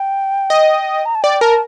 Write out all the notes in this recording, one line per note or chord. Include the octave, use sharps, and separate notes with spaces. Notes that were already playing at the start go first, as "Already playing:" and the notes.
Already playing: G5
D#5
A#5
A5
D5 G5
A#4 A5